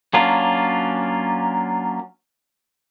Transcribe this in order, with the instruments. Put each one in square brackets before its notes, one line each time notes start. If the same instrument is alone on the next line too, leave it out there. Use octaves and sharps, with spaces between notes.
[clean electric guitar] F#3 A#3 C#4 D4 F4